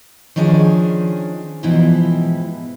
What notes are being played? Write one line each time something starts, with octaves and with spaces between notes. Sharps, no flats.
D#3 F3 C#4 D4 G#4
G#2 B2 E3 F3 E4 G4